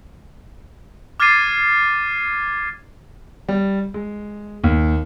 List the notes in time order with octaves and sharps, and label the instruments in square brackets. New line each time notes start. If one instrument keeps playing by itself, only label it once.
[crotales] D6 F6 G#6 A6 C7 D#7
[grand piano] G3
G#3
D#2